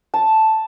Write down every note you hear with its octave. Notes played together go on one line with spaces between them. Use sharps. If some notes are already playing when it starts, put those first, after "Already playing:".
A5